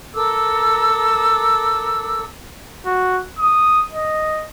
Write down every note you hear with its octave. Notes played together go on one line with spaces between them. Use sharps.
A4 A#4 D6 E6
F#4
D#6
D#5